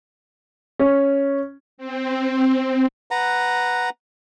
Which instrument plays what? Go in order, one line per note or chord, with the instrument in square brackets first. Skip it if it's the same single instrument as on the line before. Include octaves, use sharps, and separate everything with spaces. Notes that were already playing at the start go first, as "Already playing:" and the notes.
[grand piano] C#4
[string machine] C4
[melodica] B4 F#5 A#5